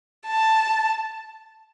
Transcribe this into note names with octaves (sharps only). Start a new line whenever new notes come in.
A5